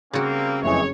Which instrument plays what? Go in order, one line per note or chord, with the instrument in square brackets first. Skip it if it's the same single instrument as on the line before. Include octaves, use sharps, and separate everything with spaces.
[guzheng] C#3 F#4 [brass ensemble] G3 A#3 C4
[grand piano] F#1 F2 G#4 [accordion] E3 G#3 A3 [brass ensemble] C#5